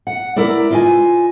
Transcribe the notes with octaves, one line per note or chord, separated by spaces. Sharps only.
F#5
E4 A#4 B4 D5
F4 D#5 G#5